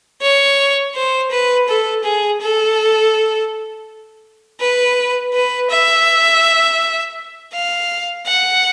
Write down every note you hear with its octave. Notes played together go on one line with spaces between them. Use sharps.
C#5
C5
B4
A4
G#4
A4
B4
B4
E5
F5
F#5